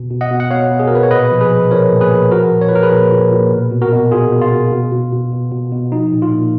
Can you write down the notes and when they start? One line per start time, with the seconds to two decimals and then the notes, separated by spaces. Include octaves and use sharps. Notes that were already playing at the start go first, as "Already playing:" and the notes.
Already playing: B2
0.11 B2
0.21 D#5 F#5
0.31 B2
0.40 F#5
0.51 B2 C#5 F5
0.71 B2
0.79 G#4
0.87 A#4
0.91 B2 B4
1.03 C#5
1.11 A#2 B4 D#5
1.32 F3
1.41 G#4 B4
1.51 F3
1.71 F3 A#4 C#5
1.91 A#2
2.01 G#4 B4
2.11 A#2
2.31 F3 F#4 A#4
2.51 A#2
2.61 C#5
2.69 B4
2.71 F3 A#4
2.83 G#4 B4
2.92 A#2
3.11 A#2
3.31 A#2
3.52 B2
3.71 B2
3.82 F#4 A#4
3.92 B2
4.12 B2 F4 G#4
4.32 B2
4.42 F4
4.52 B2
4.72 B2
4.92 B2
5.12 B2
5.32 B2
5.52 B2
5.72 B2
5.92 F3 D#4
6.12 A#2
6.22 F4
6.32 A#2